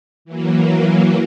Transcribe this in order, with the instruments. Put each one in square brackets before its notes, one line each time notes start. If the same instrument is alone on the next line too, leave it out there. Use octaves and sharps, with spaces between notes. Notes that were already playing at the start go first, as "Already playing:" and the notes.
[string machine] E3 F#3 A#3